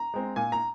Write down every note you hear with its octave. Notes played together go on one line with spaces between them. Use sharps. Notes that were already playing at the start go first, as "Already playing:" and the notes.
Already playing: A#5
G#3 C4
A#2 G#5
A#5